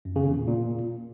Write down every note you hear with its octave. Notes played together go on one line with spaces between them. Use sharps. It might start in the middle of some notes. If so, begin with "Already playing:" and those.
F#2
C#3
E2
A#2
A#2